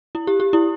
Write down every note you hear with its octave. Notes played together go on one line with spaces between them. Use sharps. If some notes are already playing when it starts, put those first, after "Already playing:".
E4
G4
G4
E4